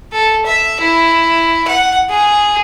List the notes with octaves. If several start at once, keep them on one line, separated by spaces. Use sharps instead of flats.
A4
E5
E4
F#5
G#4